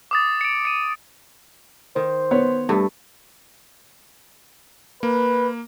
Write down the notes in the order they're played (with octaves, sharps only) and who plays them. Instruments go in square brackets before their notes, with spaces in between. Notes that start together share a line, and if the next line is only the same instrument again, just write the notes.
[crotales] D6 D#6 A6
C#7 D7
C#7 D#7
[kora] D#3 [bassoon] C5
[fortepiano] B3 C#5
[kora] G2 A3
[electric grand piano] A#3 [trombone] B4